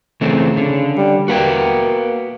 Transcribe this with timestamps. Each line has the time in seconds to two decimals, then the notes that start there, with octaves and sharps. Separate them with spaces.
0.21 C#3 E3 A3 C4
0.57 D3
0.97 G3
1.28 A#3 F#4 B4 G5